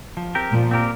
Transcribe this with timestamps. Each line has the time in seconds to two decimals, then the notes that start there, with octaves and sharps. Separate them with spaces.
0.17 F3
0.35 C4 G4 A#4
0.53 A#2 F3
0.71 C4 G4 A#4